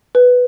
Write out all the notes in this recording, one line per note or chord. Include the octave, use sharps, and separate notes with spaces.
B4